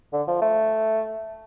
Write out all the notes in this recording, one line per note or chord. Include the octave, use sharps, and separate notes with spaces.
D3
F3
A3